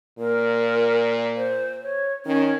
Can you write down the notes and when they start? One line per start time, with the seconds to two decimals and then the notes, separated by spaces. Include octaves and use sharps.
0.19 A#2 A#4
1.36 C5
1.82 C#5
2.26 D#3 C#4